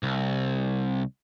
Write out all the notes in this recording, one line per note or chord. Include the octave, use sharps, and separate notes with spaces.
C2